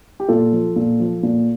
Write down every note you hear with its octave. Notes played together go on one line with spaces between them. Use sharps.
G4
A#2 F4 A4
F3
A#2
F3
A#2